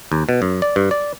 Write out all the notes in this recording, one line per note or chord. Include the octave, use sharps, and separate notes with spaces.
D#2
B2
F#2
D5
G2
D5